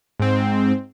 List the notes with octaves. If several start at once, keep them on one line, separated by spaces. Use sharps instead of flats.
G#2 C4